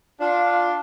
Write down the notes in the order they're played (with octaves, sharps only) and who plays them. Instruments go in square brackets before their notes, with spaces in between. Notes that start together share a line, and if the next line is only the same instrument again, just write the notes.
[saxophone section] D4 F4